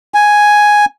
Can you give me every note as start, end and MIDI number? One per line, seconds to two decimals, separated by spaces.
0.14 0.85 80